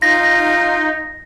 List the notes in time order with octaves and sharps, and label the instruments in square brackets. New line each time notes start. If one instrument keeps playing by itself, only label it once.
[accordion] D#4 [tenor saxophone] F4 [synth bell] A#6